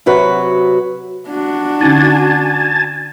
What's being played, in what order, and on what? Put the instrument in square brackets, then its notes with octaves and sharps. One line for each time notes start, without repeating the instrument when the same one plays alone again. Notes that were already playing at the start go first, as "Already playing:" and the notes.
[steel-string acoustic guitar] C3 F#3 F#4 B4
[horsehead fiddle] D4 F#4
[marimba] D3 C#4 D#4 [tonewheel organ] G#5 A5